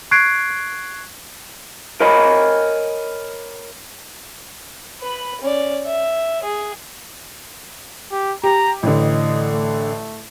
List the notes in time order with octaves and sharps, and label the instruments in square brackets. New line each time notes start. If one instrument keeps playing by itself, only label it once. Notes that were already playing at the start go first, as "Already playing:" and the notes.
[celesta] C#6 F#6 G#6 C7 D7
[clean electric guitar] A#4 C#5 D#5 G#5 B5
[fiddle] B4 B5
C#4 D5
E5
G#4
[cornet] G4
[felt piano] G4 [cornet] A#5
[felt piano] A1 D3 [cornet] D#5
[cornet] A3